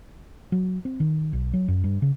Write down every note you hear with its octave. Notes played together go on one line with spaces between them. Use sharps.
F#3
C4
D#3
B1
F#3
F#2
G2
C#3